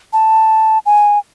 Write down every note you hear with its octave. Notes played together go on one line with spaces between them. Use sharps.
A5
G#5